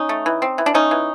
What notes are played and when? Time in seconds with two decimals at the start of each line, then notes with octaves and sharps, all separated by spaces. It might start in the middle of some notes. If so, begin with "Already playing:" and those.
Already playing: C#4 D#4
0.09 A3
0.26 E3
0.42 C4
0.58 E3
0.66 D4
0.74 A3 C#4 D#4
0.91 E3